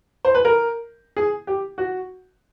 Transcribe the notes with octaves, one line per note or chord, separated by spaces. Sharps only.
C5
B4
A#4
G#4
G4
F#4